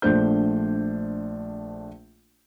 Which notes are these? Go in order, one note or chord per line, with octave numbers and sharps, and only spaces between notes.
A#1 A3 D4 C5 G6